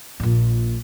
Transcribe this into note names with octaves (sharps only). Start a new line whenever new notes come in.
A#1 A#2